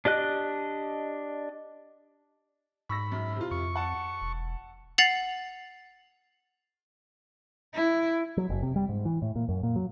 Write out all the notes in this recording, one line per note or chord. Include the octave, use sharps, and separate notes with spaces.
D4 G4 D#5 F#6
G#2 B5 C#6 E6 A#6
F#2
C3 F4
F2 C#6
F#5 A5
E1
F#5 A6 C7 F7 F#7
E4
F#3
F#1
C3
G3
G#2
E3
A2
A#2
F#2
A#2
F#3